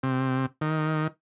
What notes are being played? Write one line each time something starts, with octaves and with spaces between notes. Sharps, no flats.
C3
D#3